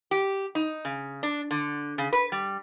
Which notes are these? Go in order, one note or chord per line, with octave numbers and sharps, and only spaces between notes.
G4
D#4
C#3
D4
D3
C#3
B4
G3